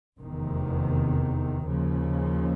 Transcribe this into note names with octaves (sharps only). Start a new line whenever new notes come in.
F1 E2 C3 D#3
D#2 C#3 F3